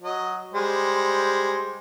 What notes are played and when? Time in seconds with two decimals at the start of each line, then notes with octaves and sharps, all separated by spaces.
0.02 F#3 D#5
0.54 G3 G#3 C5